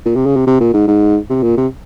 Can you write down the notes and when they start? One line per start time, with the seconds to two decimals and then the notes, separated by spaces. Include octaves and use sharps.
0.06 A#2
0.16 C3
0.26 C#3
0.36 C3
0.47 C3
0.60 A#2
0.74 G#2
0.88 G#2
1.30 C3
1.43 A#2
1.57 C3